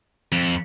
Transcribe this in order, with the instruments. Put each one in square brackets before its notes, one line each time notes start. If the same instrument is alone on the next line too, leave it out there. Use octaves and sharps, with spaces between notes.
[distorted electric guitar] F2